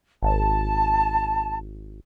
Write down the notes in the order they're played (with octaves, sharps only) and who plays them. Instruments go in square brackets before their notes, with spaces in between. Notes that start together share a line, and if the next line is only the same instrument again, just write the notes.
[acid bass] G#1 [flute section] A5